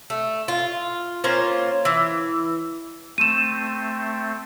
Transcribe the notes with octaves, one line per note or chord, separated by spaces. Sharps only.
A3
F4
A#3 C#4 F4 C5
E3
A3 C4 D#7 E7